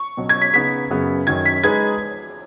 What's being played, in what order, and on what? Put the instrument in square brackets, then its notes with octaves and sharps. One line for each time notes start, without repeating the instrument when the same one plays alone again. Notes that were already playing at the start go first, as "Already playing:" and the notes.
Already playing: [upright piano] C#6
[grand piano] B2 F#3 C#4
[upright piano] G#6
B6
[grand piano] C#3 B3 D#4 [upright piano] B6
[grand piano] F#2 C#3 F#3 B3
[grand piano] F#2 D#3 F#3 C#4 [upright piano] G#6
[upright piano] B6
[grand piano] G#3 D#4 G#4 B4 [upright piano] G#6